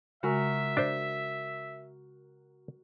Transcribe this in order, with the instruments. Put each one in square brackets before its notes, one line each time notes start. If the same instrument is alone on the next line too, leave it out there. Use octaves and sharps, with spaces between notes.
[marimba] C#3 G#3 G#5 [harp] F#4 A#4 [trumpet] E5
[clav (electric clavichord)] D4 C5